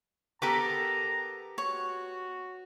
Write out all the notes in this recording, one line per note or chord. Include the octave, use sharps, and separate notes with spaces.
B3 G4 A4 A#4 A#5 D6
F#4 C#5